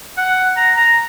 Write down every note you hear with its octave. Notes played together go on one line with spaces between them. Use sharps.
F#5
A#5
A#5